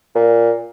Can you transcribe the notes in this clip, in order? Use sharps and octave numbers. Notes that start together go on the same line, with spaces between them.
A#2